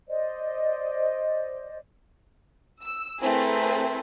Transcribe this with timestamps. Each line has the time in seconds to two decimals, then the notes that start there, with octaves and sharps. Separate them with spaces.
0.08 C5 D5 D#5
2.82 E6
3.21 A3 C4 E4 G#4 A#4 B4